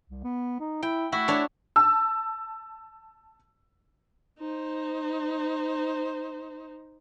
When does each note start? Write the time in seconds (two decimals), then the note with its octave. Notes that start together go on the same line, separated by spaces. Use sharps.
0.10 C2
0.24 B3
0.60 D#4
0.83 E4 G5
1.12 A3 E4 F#4
1.28 D4 C#5
1.76 A5 E6
4.39 D#4 C5